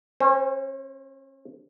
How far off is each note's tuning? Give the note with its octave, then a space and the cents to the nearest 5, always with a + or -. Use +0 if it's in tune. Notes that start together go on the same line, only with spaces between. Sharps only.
C#4 -40 C5 +0